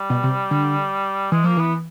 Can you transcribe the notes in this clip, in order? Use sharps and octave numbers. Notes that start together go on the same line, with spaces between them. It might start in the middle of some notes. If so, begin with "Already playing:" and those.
Already playing: G3
B2
C3
D3
E3 G#3
F3 A#3
E3 B3